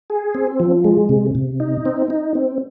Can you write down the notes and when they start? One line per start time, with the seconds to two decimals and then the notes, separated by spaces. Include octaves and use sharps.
0.10 G#4
0.35 C4
0.60 F3
0.84 G#3
1.09 C3
1.35 C3
1.60 D#4
1.85 C4
2.10 D#4
2.35 C4